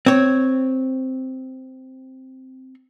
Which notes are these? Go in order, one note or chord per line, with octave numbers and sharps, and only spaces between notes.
C4 C#5